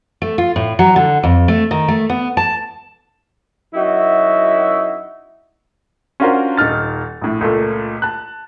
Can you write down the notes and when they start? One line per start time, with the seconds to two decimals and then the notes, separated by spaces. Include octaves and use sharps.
0.22 A3
0.38 F4
0.56 A2
0.79 F#3
0.96 D3
1.23 F2
1.48 A3
1.71 D#3
1.88 A3
2.10 B3
2.37 A5
3.74 F#2 D#4 E4 F#4 E5
6.20 C#4 D4 F4 F#4 A#4 C5
6.57 D#1 D#4 F6 A6
7.22 A#1 A2
7.41 C#2 A#2 A3
8.02 A5 F#6